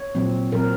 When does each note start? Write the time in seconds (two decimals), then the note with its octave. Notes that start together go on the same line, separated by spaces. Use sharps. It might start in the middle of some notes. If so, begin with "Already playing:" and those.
Already playing: C#5
0.15 A#2 F#3 C4
0.52 A#2 F#3 C4 A#4